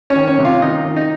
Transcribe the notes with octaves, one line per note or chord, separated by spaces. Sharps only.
C#4 C#5
D#3
C#4 C#5
C3
F4 F5
D#3 D#4 D#5
D#3
D#4 D#5